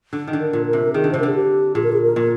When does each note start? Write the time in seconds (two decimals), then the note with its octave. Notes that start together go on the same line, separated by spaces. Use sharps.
0.13 D3
0.27 D#3
0.33 D3
0.40 A#4
0.53 A#2
0.66 A#4
0.73 C3
0.94 D#3 G#4
1.04 D3
1.12 C3 C5
1.19 A#4
1.23 D3 G#4
1.34 G4
1.75 A#2 G#4
1.84 A#4
1.93 G#4
2.02 A#4
2.16 A#2